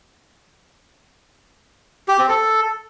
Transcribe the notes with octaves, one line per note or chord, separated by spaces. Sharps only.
G4
C4
A4